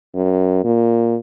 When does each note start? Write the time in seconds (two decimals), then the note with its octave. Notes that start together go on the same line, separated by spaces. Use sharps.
0.15 F#2
0.64 A#2